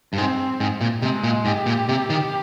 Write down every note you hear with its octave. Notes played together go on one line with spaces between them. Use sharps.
G2
G#2 C4
G#2
A#2
C3 G#3
A#2
G#2 G4
A#2
C3
D#3